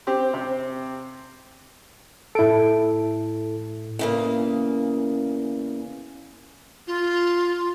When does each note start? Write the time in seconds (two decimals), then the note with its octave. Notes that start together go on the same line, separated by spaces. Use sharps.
0.07 C4 G4
0.33 C3 C4
2.35 A2 E4 A4 D7
3.99 E2 C#3 A#3
6.87 F4